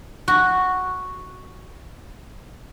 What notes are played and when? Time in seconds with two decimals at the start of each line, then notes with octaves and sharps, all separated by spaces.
0.28 F#4